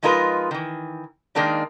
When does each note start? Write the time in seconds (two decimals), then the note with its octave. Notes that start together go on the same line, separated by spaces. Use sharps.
0.03 F3 G#3 D#4 F4 A#4 B4
0.51 D#3 E3
1.35 D#3 G#3 A#3 D4 D#4